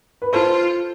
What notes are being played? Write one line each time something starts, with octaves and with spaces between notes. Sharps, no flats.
B4
F4 A4 C5